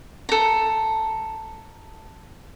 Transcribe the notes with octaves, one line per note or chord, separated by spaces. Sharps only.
A4 A#5